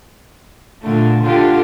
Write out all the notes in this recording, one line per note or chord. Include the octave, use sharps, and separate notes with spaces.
A#2 D3 A3
D3 F4 G4